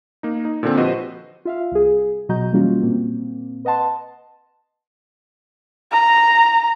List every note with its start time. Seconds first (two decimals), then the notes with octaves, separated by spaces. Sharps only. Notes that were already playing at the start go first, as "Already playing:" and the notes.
0.23 A#3 D#4
0.45 D#4
0.63 A#2 D3 C4
0.77 F3 F#4 G4 B4 C5 D#5
1.45 F4 E5 F5
1.72 C2 G#4
2.29 B2 F#3 F#4 D#5 A#5 G6
2.52 E3 G3 A#3 C#4 F4 F#4
2.82 A#2 A#3 C4
3.65 B4 D#5 F#5 A5 C6
5.91 A#5